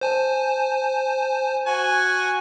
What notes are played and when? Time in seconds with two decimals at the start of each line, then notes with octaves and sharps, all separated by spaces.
0.01 C5 G#5 A5
1.67 F#4 G#5